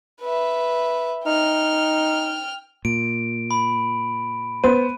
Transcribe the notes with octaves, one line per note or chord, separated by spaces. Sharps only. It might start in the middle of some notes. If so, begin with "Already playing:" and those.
B4 E5
D#4 G5 F6
A#2 D7
B5
B3 C5 D#7